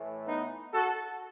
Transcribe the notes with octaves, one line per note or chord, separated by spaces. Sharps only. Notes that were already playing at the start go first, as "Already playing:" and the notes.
Already playing: A2 E3 A3
B3 D#4
F#4 A4